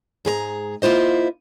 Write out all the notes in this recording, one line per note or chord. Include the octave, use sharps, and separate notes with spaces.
G#2 G#4 B4 A#5
A#3 E4 F4 C5 D#5